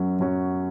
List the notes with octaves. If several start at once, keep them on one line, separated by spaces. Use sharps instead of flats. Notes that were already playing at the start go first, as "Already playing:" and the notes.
Already playing: F#2 F#3 C#4
F#2 F#3 C#4